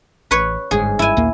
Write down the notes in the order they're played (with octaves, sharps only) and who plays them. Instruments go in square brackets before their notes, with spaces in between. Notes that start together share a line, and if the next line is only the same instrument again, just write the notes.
[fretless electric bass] A1 [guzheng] B4 C#5
[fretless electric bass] G1 G#2 [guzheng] G#4
[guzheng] E4 G#5
[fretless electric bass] A#1 D#2 A#3